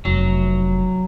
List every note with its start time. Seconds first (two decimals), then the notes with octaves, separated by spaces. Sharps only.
0.05 F1 F#3